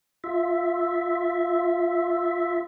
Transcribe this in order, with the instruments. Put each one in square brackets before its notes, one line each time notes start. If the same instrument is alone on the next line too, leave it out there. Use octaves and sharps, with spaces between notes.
[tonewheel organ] F4 E5